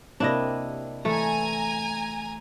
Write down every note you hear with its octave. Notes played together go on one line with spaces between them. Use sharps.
C3 A#3 C4 D4 E4 D#5
E3 A3 G#5 A#5